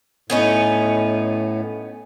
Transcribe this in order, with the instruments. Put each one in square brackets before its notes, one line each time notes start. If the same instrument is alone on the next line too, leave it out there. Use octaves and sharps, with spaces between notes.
[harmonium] A2 [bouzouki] B3 C#4 D#4